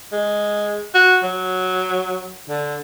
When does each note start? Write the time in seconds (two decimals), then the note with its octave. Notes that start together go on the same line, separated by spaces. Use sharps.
0.12 G#3
0.94 F#4
1.23 F#3
2.49 D3